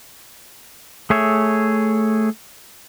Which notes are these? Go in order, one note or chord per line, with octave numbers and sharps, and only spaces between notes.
A3 G#4 C#5 E5